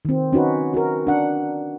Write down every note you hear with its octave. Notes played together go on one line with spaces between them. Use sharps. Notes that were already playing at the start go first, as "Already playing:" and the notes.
D#3 C4
C#4 D#4 F#4 B4
F#4 A#4
D4 F#5